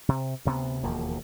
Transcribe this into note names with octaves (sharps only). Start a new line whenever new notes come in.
C3
D2 C3 A3 B3
E1 D#2 F3 A#3